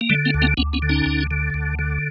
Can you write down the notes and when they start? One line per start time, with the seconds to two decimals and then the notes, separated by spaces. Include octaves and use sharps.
0.01 A#3
0.10 D3 G3 A3
0.25 A#3 C4
0.34 D2
0.42 A#3 C4
0.57 D2 B3 C#4
0.73 B3 C#4
0.82 D3
0.89 C#4 D#4
1.06 D2
1.31 D3
1.54 D2
1.79 D3